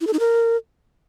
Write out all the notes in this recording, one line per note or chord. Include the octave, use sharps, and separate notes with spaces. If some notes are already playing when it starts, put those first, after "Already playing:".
E4
A4
D#4
A#4